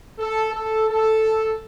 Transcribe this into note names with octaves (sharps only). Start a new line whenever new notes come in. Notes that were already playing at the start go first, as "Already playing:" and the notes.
A4
A4
A4